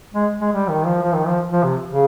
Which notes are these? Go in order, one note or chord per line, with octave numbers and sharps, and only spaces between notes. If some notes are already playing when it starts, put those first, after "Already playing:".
G#3
G#3
G3
D#3
F3
F3
D#3
F3
F3
C3
C#3